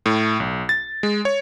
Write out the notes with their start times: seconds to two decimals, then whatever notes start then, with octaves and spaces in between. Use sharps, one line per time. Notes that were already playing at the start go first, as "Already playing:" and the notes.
0.06 A2
0.40 B1
0.69 A6
1.03 G#3
1.25 C#5